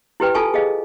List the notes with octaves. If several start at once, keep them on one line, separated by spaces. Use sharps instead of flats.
E4 G4 B4 G5
F4 A4 G#5 A5 C#6
G#4 D#5 F5